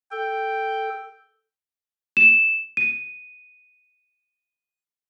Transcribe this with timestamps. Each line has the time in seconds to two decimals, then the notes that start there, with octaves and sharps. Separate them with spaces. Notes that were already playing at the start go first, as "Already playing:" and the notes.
0.12 A4 G5
2.17 E7
2.77 D#7